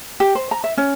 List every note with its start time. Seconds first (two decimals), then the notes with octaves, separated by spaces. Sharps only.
0.20 G4
0.35 C5
0.51 A#5
0.64 E5
0.77 C#4